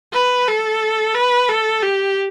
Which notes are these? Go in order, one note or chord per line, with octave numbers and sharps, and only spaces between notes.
B4
A4
B4
A4
G4